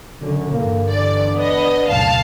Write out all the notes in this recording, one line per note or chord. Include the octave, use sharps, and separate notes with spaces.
F#2 D3
G2 D3 E3 A#3
D4 D5
B3 D#5
F#1 D2 B2 F5 A5